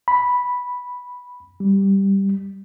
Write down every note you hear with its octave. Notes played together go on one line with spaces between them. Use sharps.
B5
G3